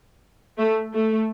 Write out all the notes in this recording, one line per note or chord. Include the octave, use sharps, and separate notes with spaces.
A3
A3